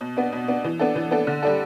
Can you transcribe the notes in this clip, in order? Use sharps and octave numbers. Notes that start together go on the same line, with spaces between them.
B2
B3 D4
B2
B3 D4
E3
B3 D4 A4
E3
B3 D4 A4
D3
G3 D4 A4